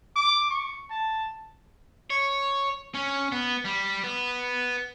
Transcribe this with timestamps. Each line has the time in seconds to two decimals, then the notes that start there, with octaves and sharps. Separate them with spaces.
0.16 D6
0.50 C#6
0.90 A5
2.10 C#5
2.95 C#4
3.32 B3
3.65 G3
4.04 B3